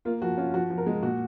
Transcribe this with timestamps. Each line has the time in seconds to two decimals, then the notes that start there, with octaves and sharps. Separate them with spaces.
0.05 A#3 F4
0.22 F3 F#4
0.38 C#4 F4
0.54 F3 F#4
0.70 F3
0.78 A#4
0.86 G#3
1.03 A#2 F#4